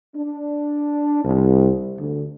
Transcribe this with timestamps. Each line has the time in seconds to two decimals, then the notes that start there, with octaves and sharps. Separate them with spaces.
0.16 D4
1.24 C2
1.99 D2